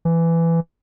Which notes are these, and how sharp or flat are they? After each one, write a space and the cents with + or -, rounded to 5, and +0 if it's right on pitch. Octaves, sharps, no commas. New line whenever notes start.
E3 +15